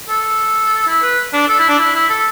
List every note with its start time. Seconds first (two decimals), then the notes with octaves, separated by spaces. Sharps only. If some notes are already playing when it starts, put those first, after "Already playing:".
0.09 A4
0.87 E4
1.02 B4
1.33 D4
1.48 A4
1.59 E4
1.68 D4
1.79 E4
1.94 E4
2.09 A4